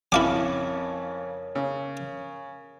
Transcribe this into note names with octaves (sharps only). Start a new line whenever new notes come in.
F2 C#3 E4 A#4 C#5 F5 D6
C#3